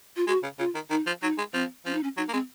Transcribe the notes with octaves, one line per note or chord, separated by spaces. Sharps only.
F4
G#3 F#4
C#3
C#3 F4
D#3
D#3 D#4
F3
F#3 D#4
G#3
F3 C4
F3 C#4
D#4
C#4
F#3 D#4
A#3
G#3 C4